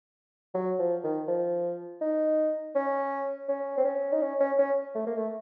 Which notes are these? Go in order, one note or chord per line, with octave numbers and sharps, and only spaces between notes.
F#3
F3
D#3
F3
D#4
C#4
C#4
C4
C#4
D#4
C#4
C#4
C#4
A3
A#3
A3